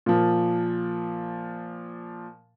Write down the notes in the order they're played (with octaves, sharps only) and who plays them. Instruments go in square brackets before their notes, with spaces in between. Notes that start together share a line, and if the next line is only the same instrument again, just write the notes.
[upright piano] A#2 F3